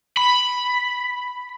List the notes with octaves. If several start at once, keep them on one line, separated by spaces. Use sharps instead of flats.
B5